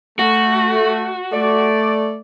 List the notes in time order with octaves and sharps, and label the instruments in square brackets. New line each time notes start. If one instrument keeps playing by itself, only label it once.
[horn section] A3 [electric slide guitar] F#4
[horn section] A3 D5